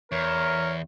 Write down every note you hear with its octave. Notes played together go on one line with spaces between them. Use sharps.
E2 A#4 C#5